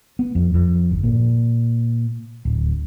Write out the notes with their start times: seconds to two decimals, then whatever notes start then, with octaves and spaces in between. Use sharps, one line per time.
0.19 B3
0.35 F2
0.54 F2
0.91 G1
1.03 A#2
2.45 D1